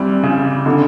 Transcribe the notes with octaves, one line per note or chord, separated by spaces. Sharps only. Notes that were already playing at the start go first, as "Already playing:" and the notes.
Already playing: E3 G3 C4
C#3
D3